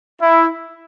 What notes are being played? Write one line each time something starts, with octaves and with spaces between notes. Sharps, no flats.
E4